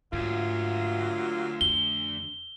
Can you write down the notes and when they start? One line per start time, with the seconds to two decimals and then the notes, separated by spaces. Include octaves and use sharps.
0.13 D2 G#2 F#3 A#3 F4
1.61 F2 G7